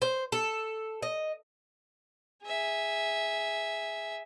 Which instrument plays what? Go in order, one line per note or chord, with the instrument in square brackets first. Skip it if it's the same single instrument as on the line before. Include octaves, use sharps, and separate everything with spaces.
[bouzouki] C5
A4
D#5
[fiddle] G#4 E5